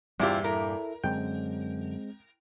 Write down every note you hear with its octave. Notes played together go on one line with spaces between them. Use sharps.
E2 G2 A#2 G3 C4 E4 F4 G4
E4 A4 A#4 E5
F#2 D3 G#3 C4 G5